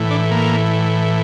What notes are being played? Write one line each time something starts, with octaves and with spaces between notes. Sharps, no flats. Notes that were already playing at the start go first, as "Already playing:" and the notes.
Already playing: A2 E3
D4
A#3